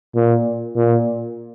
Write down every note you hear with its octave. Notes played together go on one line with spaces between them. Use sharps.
A#2
A#2